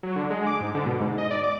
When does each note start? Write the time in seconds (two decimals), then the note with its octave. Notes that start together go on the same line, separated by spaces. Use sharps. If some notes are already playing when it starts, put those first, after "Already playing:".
0.03 F#3
0.16 D3
0.30 G#3
0.46 D6
0.60 G#2
0.75 D3
0.86 B2
1.00 G#2
1.18 D#5
1.30 D5
1.44 D6